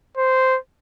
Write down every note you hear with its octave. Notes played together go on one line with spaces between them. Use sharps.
C5